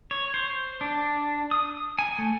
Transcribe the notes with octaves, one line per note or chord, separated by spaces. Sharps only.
C#5
C5
D4
D#6
G#5
A3